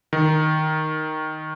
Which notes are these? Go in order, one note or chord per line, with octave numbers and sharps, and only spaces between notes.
D#3